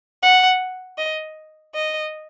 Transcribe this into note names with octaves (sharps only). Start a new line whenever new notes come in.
F#5
D#5
D#5